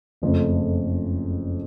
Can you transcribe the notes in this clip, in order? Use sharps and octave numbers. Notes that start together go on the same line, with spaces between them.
F#1 F2 C#3 F3 A3